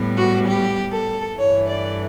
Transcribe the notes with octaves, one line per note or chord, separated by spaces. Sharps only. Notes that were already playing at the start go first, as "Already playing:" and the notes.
Already playing: A2 G3 B3
F#4
G4
A4
G2 E3 A3 C#5
D5